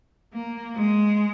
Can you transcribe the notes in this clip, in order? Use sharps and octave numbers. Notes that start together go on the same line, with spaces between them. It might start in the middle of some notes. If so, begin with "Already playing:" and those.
A#3
G#3